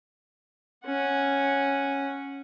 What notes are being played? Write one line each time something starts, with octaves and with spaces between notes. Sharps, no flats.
C#4 F#5